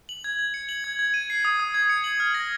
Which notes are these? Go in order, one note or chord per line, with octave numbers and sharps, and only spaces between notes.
F#7
G#6
G#6
C#7
F#7
G#6
G#6
D#7
C7
D#6
D#6
G#6
C#7
F#7
F6
A#6